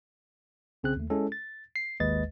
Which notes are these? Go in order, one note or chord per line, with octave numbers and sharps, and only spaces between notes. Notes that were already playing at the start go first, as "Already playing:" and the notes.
B1 C#3 C4 G#4 F#6
D#2 A3
G#3 C#4 E4 G#4 A4
A6
C7
G#1 D#2 G#3 B4 D#5 A6